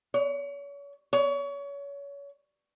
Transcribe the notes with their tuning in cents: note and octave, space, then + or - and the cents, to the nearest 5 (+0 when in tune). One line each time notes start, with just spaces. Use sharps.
C#5 +35
C#5 +30